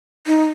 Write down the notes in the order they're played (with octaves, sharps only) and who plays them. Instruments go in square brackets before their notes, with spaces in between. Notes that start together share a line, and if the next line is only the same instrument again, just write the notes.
[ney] D#4